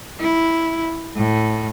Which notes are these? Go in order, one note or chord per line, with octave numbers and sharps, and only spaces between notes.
E4
A2